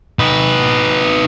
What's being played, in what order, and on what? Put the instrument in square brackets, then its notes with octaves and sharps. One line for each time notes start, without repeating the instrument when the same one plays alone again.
[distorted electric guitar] D#4 B4